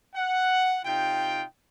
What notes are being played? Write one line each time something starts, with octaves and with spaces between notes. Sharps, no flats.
F#5
C3 D#4 F4 G5